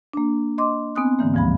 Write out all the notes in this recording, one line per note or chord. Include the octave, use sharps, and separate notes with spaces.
A#3 D4
D#5 C6 D6
B3 C4 G#5 D#6 F#6
G#2 D3 E3 A#3
D2 G2 F3 G#3 B5